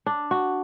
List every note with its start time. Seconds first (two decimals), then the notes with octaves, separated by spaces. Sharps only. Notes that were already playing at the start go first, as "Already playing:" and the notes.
0.06 D4
0.31 F#4